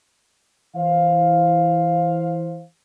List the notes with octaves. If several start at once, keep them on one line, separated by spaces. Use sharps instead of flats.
E3 C5 F5